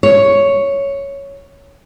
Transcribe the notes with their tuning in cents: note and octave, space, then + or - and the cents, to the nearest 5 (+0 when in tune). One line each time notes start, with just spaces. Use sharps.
C#5 +5